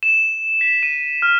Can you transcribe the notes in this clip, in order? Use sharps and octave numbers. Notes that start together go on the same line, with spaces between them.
E7
B6
D#7
F6